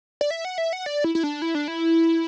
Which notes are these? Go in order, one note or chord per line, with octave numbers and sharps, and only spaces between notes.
D5
E5
F#5
E5
F#5
D5
E4
E4
D4
E4
D4
E4